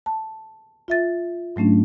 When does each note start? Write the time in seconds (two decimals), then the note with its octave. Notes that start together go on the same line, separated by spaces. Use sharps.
0.06 A5
0.88 F4 E5 A6
1.56 G#2 F#3 A3 C#4 D4